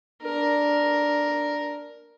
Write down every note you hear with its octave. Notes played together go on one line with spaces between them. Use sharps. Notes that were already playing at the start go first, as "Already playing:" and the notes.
D4 A#4